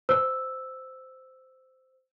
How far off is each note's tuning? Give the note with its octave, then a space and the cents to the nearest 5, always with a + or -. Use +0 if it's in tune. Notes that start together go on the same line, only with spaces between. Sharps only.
C5 -10 E6 +0